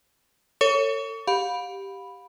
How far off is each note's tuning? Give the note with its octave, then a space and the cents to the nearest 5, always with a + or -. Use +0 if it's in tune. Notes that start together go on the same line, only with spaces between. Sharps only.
A4 +40 C#5 +0 C#6 +40
G4 +0 F5 +30 B5 +0